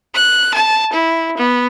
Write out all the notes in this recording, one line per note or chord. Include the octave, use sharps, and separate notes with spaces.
F#6
A5
E4
B3